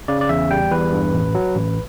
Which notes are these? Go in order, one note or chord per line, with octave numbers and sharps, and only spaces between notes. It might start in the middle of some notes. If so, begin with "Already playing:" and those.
C#3 D5
D5
E2 E5
G3 G5
E2 B4
G2
A1
F#3
A1